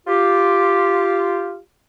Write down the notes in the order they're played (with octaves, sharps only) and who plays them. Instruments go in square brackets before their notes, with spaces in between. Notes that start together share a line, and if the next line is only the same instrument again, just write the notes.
[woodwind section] F4 G4